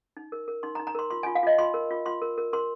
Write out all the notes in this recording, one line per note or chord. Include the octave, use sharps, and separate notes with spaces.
D#4
A#4
A#4
D#4 C6
A#5
D#4
A#5
A#4 C6
F4 C6
F4 G#5
F5
F4 D#5
F4 C6
A#4
F4
F4 C6
A#4
A#4
A#4 C6